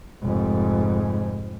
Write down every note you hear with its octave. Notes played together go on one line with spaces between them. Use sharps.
F1 G#2